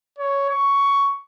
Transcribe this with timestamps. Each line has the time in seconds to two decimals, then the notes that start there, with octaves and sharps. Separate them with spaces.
0.19 C#5
0.49 C#6